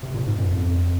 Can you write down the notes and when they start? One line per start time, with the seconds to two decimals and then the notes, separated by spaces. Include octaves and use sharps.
0.03 C3
0.14 A#2
0.27 G#2
0.38 F#2
0.50 F2